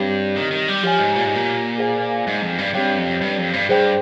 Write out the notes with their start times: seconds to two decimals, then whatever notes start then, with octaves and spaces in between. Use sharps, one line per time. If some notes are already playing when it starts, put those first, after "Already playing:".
Already playing: G2 C4 G4 C#5
0.36 D#3
0.52 D#3
0.68 G3
0.83 F3 G4 C#5 G#5
0.99 G#2
1.16 A#2
1.25 G#2
1.35 A#2
1.78 G#4 C5 F5 G#5
2.27 G#2
2.42 F2
2.58 G2
2.74 G2 C4 G4 C#5 G5
2.98 F2
3.21 G2
3.38 F2
3.53 G2
3.69 G2 G#4 C5 G5